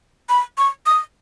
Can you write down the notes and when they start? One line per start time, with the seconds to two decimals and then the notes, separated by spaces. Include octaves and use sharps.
0.29 B5
0.58 C#6
0.86 D#6